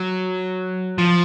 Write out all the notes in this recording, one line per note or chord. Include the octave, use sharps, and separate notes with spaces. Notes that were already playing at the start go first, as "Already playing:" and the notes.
Already playing: F#3
F3